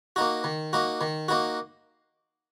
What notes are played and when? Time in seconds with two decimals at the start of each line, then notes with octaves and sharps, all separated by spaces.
0.16 A#3 D#4 F#4
0.44 D#3
0.73 A#3 D#4 F#4
1.01 D#3
1.28 A#3 D#4 F#4